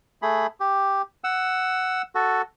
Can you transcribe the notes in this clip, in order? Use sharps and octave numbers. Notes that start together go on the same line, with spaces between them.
A3 G#4 B5
G4
F#5 E6
F#4 A4